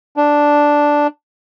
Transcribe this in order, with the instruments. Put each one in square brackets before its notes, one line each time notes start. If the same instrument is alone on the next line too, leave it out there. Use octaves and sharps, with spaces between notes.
[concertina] D4